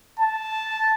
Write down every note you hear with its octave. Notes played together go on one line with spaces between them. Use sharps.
A5